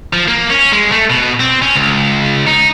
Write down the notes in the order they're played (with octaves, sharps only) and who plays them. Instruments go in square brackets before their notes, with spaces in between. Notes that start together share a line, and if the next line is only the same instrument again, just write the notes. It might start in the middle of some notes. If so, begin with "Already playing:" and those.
[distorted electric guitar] F3
A#3
C#4
G#3
A3
B2
C4
C#4
C#2
D#4